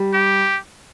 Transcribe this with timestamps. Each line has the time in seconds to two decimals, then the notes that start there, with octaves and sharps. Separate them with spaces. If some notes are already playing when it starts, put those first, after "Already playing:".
Already playing: G3
0.14 G4